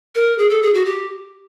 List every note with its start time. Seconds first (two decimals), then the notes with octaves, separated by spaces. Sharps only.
0.15 A#4
0.38 G#4
0.49 A4
0.62 G#4
0.74 F#4
0.85 G4